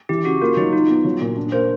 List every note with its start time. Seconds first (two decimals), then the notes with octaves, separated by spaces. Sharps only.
0.09 E3 G4
0.25 C#3 F#4
0.41 A#3 F4
0.57 F#3 D#4
0.73 D#4 F4
0.89 B3
1.05 F#3
1.21 A#2
1.37 D4
1.52 A#3 C5